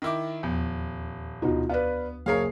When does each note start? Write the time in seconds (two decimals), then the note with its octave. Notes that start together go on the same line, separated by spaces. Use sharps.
0.02 D#3 E4 D6
0.43 D#1 E2 F3 B3
1.42 D2 B2 D#4 F4 F#4
1.69 B3 B4 D5 F5
2.26 F#1 G#4 A#4 C#5 F5 C7